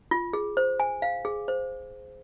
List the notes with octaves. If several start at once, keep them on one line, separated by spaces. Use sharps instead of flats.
F4
G#4
C5
G#5
F5
G#4
C5